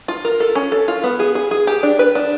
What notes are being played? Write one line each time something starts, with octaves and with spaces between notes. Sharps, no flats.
F4
A#4
A4
C#4
A4
F4
B3
G#4
G#4
G#4
G4
D4
B4
D4